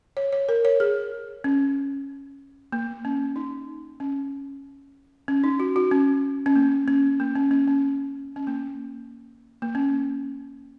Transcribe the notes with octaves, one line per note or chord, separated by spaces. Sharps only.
C#5
C#5
A#4
C#5
G#4
C#4
A#3
C#4
D#4
C#4
C#4
D#4
F#4
F#4
C#4
C#4
A#3
C#4
A#3
C#4
C#4
C#4
C#4
A#3
A#3
C#4